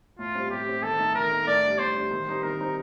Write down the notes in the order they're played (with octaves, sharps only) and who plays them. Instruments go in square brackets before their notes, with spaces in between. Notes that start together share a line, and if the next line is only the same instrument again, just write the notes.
[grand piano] A2 [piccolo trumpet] F4
[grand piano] G3 C4
[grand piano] A2 [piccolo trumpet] G4
[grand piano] G3 C4
[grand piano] D#3 [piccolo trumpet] A4
[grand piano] A3 D#4
[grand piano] D#3 [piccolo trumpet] A#4
[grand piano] A3 D#4
[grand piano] A2 [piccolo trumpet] D5
[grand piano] G3 D4
[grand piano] A2 [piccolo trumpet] C5
[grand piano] G3 D4
D#3
G3 C4 D#4
[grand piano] D#3 [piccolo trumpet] A#4
[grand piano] G3 C4 D#4